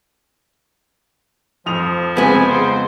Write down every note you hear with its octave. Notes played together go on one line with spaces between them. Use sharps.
F2 F3 D#6 F7
G#3 B3 C4 G#5
C#3 C5